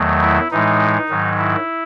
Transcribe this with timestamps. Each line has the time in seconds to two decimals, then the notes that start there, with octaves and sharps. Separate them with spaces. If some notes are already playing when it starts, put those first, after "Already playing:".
Already playing: E2 D#3 F#3 A3
0.21 E4
0.51 A2 E3 G#3 D#4
1.09 G#2 D#3 F#3
1.38 E4